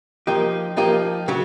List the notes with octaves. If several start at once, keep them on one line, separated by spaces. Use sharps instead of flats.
F3 A#3 D#4 G4
F3 A#3 D#4 G4
C#3 F#3